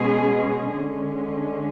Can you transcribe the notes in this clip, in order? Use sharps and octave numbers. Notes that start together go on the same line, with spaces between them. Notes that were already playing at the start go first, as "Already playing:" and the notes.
Already playing: B2 G#3 C#4 G#4
D3 G#3 C#4